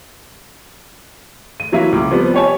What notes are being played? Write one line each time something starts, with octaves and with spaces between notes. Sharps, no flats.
D#7
E3 F#3 A#3 E4 E5
C#2 D6
C3 F3 G3 B3
G4 C#5 G#5 A5